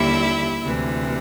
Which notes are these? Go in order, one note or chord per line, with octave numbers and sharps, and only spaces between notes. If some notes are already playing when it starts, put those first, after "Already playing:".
Already playing: D#2 D3 G3 E4 E5
D2 C3 E3